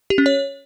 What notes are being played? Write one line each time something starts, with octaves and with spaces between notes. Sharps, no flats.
G4
C#4
C#5